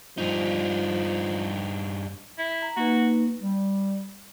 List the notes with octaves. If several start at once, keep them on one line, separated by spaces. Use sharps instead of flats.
G2 F3 D#4
E4
A#5
A#3 D#4 F#4 B4
G3